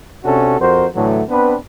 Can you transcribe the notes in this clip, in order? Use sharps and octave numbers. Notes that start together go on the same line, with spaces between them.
C3 C#4 D4 F#4 A4
F2 F#4 A#4 C5
A2 D3 E3 F#3 A3
B3 C4 D4 B4